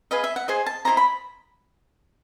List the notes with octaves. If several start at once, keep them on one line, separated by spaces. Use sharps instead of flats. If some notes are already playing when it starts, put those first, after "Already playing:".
G#4 B4 D#5 F5
E5
F#5
G#4 C5 D#5 G#5
A5
E4 G#4 C5 D#5 A#5
B5